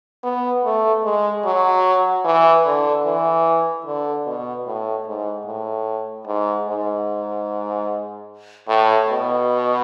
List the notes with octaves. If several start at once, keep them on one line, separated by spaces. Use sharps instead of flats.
B3
A3
G#3
F#3
E3
D3
E3
D3
B2
A2
G#2
A2
G#2
G#2
A2
B2